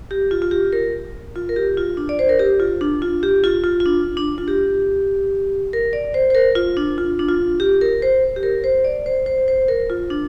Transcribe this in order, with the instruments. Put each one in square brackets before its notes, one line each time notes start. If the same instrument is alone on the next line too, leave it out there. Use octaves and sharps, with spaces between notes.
[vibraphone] G4
F4
F4
G4
A#4
F4
A#4
G4
F4
D4
D5
C5
A#4
G4
F4
D4
F4
G4
F4
F4
F4
D4
D4
F4
G4
A#4
D5
C5
C5
A#4
F4
D4
F4
D4
F4
G4
A#4
C5
G4
A#4
C5
D5
C5
C5
C5
A#4
F4
D4